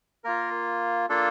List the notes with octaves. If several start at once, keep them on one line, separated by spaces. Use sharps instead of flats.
A#3 F4 A#4
A#3 D4 F4 A4